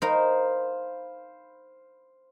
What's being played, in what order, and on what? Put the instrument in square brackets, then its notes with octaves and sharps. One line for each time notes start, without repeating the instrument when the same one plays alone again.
[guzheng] D#4 A#4 [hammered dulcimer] C5 F5 B5